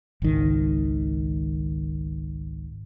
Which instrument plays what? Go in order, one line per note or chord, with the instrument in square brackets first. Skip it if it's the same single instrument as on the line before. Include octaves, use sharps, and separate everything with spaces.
[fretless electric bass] G#1 C#2 D#3